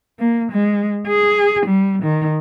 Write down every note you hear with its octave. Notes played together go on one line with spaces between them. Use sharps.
A#3
G#3
G#4
G3
D#3